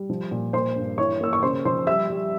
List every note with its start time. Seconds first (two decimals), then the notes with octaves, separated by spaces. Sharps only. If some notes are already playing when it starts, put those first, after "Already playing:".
Already playing: G3
0.10 F3
0.31 A#2
0.53 A#3 C5 C6
0.76 G2
0.98 E3 C#5 C#6
1.21 A#3 E6
1.33 C#6
1.43 C#3 C5 C6
1.65 F3 C5 C6
1.87 G3 E5 E6
2.10 G3